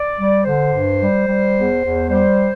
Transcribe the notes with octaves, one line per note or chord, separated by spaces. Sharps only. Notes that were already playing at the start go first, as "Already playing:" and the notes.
Already playing: D5
G3
D3 C5
G2
G3
G3
E2
E2
G3 C5